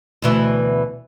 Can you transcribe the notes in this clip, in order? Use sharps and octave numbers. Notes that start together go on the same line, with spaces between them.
D2 B2 E3